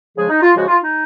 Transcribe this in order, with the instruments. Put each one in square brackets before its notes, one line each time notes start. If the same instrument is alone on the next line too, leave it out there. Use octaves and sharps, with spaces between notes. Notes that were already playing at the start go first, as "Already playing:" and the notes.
[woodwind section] C#3 F3 G#3 G#4
D#4
F4
C#3 F3 G#3 F#4
F4
D#4